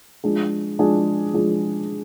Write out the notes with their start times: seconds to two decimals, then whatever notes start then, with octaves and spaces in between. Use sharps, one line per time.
0.24 F3 G#3 D4 G#4
0.79 F3 G#3 D4 G#4
1.34 F3 G#3 D4 G#4